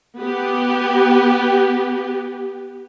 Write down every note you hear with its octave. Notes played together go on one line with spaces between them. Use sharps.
B3 G4